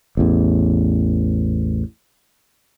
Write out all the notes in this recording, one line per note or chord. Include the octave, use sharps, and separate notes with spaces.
A1 E2